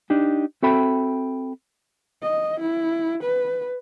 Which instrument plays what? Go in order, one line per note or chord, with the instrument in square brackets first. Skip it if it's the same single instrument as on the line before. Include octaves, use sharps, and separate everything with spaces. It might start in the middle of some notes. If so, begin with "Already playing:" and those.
[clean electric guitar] D4 D#4 G4
C4 F#4 A4 E5 G5 B5
[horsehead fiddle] D#5
E4
B4